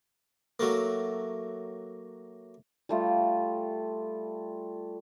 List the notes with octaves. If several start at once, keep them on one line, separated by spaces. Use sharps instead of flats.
F#3 A3 A#3
G3 A3 F4